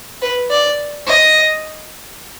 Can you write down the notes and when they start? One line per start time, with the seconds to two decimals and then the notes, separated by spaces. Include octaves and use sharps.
0.22 B4
0.50 D5
1.07 D#5